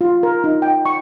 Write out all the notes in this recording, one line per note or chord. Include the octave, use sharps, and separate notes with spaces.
F4
A#4
D#4
G5
C#6